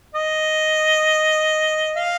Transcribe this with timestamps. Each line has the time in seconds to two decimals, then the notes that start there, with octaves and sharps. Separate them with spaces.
0.15 D#5
1.96 F5